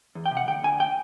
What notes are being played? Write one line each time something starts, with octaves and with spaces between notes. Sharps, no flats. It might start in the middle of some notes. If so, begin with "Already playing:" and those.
E2
G5
C3
F#5
D2 G5
D2 G#5
G5